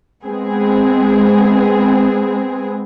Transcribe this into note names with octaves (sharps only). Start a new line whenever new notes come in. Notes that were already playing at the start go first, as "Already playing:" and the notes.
G#3 B3 C4 G#4